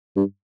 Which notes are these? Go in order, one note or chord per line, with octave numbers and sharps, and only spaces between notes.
G2